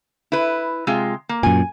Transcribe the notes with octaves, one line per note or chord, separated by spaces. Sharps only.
E4 B4
C3 G#3 F4
A#3
F#2 A#2 G#5